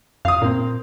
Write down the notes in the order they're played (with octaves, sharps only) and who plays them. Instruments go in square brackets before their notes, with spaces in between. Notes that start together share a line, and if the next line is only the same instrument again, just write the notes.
[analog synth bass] F#2 [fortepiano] F5 D#6
[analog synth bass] A#2 [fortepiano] A#3 C4